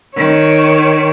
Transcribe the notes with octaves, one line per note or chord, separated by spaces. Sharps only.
D#3 C#5